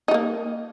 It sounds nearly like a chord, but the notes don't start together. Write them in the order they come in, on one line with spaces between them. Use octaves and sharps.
D#4 A3 A#3